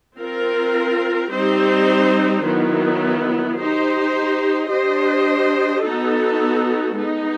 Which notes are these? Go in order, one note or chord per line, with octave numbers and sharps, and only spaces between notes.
C4 F4 A#4
G3 C4 D#4 G4 C5
D#3 F#3 B3 E4
D#4 G4 C5
D4 G4 C5 D#5
B3 D#4 F#4 A4
G#3 B3 D#4